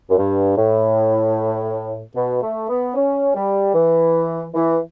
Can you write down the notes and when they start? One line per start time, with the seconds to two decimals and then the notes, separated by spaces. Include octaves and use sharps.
0.10 F#2
0.17 G2
0.57 A2
2.15 B2
2.42 A3
2.68 B3
2.94 C#4
3.34 G3
3.74 E3
4.54 E3